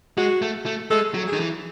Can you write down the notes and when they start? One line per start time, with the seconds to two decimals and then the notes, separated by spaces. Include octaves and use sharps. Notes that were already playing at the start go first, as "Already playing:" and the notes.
0.17 G#3 F#4
0.42 A3
0.66 A3
0.90 G#3 A4
1.14 F#3
1.27 G#4
1.33 D#3
1.40 E3